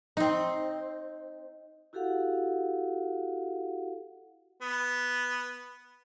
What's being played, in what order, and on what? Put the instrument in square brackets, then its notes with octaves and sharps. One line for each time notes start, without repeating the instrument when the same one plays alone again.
[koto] C4 D#4
[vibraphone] E4 F#4 G4 A4 F5 F#5
[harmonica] B3